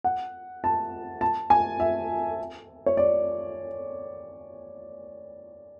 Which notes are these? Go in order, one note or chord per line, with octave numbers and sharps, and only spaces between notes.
F#5
A5
A5
G#5
E5
C#5
D5